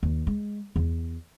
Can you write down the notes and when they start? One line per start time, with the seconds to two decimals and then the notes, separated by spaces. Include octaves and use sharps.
0.03 D#2
0.27 G#3
0.76 E2